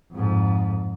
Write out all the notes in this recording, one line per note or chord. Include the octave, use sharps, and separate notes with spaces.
F2 G#2